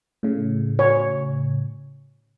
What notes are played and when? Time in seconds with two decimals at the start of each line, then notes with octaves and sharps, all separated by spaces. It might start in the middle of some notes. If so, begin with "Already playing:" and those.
0.23 A2 C#3
0.79 C#5